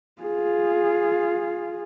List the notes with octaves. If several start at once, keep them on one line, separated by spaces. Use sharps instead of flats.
F4 G#4